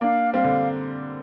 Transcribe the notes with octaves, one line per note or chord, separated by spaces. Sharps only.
A#3 D4 F5
G3 C4 F5
D3 G3